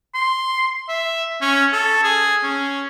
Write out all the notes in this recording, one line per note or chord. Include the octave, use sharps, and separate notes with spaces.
C6
E5
C#4
A4
G#4
C#4